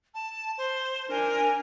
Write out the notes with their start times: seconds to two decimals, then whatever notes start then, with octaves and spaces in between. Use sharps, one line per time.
0.14 A5
0.58 C5
1.09 D4 A#4 G#5